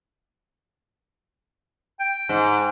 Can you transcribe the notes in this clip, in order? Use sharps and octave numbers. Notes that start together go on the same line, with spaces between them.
G5
G#2